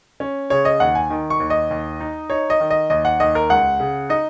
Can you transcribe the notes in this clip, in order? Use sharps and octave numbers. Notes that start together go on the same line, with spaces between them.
C#4
C#3 C#5
D#5
D#2 F#5
G#5
D#3
C#6
D#2
D#5
D#2
D#4
D#4 C#5
D#5
D#3
D#5
D#2 D#5
F#5
D#2 D#5
A#4
C#2 F#5
C#3
D#4 D#5